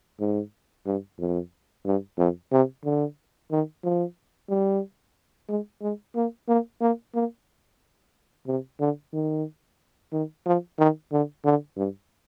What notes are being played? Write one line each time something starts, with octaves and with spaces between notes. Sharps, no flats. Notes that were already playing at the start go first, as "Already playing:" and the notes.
G#2
G2
F2
G2
F2
C3
D3
D#3
F3
G3
G#3
G#3
A#3
A#3
A#3
A#3
C3
D3
D#3
D#3
F3
D#3
D3
D3
G2